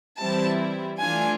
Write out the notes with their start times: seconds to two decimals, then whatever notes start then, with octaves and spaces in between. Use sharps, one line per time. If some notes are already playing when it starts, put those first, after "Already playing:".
0.21 E3 G3 C4 E4 A5
1.01 E3 A3 D4 F4 G#5